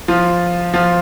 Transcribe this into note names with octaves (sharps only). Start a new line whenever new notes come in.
F3 F4
F3 F4